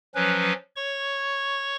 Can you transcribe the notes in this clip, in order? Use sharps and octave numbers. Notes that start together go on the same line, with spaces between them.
F3 F#3 C#4 B4
C#5 C#6